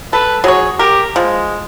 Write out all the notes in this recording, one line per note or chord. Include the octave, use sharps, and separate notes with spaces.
A4 B4
F#3 G#4 C#5
G4 A#4
F3 G#3